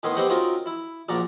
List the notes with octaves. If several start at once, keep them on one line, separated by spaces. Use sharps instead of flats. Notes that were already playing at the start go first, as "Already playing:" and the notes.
A2 D#3 B3 G#5 C6
B3 C4 G4 C5 D#5 F#5
C4 C#4 D#4 F4 F#4 A#4
E4
A#1 A#2 F#4 D5 A#5